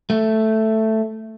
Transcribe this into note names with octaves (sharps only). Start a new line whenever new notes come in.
A3